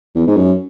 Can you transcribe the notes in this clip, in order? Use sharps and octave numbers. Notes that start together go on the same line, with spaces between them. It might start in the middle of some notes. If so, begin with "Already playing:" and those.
E2
G#2
F#2